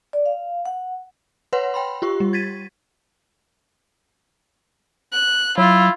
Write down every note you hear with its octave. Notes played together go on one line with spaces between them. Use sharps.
D5
F5
F#5
B4 C#5 F#5 C6
G5 B5 C6
F4 G4 C#6
G3
G#6 A6 B6 D#7
F#6
F#3 E4 F4